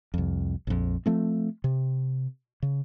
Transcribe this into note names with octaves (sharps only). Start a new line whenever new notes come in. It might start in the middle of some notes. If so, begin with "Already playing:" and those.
C2 F2
A#1 F2
F3 A3 C4
C3
C#3